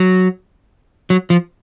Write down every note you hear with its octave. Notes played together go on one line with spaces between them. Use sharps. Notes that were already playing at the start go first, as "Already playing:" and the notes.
Already playing: F#3
F#3
F3